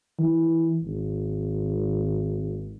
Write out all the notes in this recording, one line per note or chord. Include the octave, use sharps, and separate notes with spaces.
E3
G#1